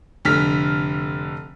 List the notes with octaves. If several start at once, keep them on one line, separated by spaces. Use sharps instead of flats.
F1 D3 F6 B6